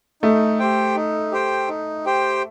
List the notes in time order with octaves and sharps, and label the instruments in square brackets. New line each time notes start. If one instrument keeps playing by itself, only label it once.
[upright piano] A3 [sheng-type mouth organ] D#4
[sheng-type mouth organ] G4 C5 G5
D#4
G4 C5 G5
D#4
G4 C5 G5